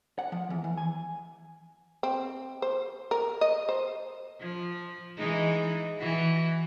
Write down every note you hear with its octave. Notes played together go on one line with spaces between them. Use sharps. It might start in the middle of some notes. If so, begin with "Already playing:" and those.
F#5
F3
E2
E3
G#5
C4
C5
A#4
D#5
C5
F3
E3 G#3 D#4
E3 F#4